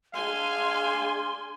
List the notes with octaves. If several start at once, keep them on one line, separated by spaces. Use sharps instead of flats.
D4 G#4 F5 G#5 C6